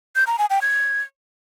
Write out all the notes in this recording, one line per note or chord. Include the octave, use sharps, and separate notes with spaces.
G6
A#5
G#5
G5
G#6